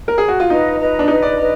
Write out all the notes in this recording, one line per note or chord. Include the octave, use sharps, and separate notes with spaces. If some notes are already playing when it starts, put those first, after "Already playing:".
A#4
G#4
F#4
F4
D#4 B4 D#5 A#5
B4 D#5 A#5
D4
D#4 B4 D#5 A#5
D5
B4 D#5 A#5